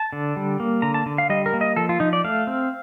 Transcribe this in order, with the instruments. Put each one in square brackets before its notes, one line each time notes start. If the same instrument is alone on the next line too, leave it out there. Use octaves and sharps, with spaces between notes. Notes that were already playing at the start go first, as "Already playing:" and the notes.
Already playing: [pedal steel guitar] A5
D3
G3
A#3
D3 A#5
A5
D3
F5
G3 D#5
A#4
A#3
D#5
F3 A4
F4
F3 D#4
D5
A3 F5
C4